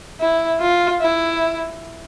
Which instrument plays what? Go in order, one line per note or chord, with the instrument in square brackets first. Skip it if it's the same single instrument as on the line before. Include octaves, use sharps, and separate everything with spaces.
[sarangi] E4
F4
E4